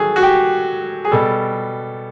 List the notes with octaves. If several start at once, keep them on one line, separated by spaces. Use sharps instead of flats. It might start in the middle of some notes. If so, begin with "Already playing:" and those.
Already playing: D#3 F#3 G#4 A4
F#4
G4
G#4
B2 G3 A4